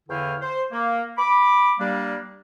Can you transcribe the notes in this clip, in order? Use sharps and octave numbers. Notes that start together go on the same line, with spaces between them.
E2 D3 E4 C#5 F5 G5
C5
A#3
B5 D6
G3 A#3 D4